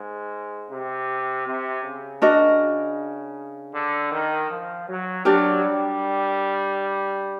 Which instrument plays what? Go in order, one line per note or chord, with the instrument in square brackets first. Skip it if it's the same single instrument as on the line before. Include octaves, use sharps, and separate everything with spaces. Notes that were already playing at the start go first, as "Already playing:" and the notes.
Already playing: [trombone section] G#2
C3
C3
C#3
[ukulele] D4 F#4 A#4 D#5
[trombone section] D3
D#3
F3
F#3
[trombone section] F#3 [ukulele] D4 G4 A#4 D5
[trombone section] G3